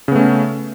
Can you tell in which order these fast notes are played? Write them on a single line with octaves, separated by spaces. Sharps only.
C#3 B3 A3 C#4